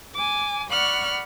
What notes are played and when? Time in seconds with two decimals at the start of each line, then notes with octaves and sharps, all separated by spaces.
0.16 G#5 D6
0.71 D5 F#5 B5 C#6 F6 F#6